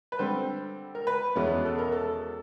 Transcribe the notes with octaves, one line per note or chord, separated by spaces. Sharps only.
B4
D3 G3 C4 C5
A#4
B4
E2 B2 G#3 C#4
A4
A#4
A4